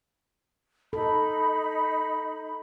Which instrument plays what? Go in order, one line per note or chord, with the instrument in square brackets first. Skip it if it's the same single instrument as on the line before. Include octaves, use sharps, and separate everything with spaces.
[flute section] D#4 B5 [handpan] A4